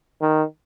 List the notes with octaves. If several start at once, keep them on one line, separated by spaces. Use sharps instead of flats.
D#3